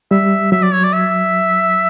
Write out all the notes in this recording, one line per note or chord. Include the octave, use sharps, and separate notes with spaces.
G3 E5
F#3 E5
D5
C#5
D5
E5